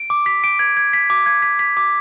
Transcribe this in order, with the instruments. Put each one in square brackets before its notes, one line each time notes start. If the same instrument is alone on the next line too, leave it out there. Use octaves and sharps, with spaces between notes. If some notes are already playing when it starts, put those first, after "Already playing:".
Already playing: [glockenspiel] D7
D6
B6
D7
G#6
G#6
B6
D6
G#6
B6
B6
D6